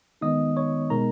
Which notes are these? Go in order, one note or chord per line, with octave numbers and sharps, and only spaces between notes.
D#3 G#3 B3 D#4 D#5 D#6
C#5 C#6
B2 G#3 B3 D#4 A#4 A#5